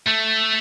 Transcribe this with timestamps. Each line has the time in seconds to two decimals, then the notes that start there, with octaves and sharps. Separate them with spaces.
0.07 A3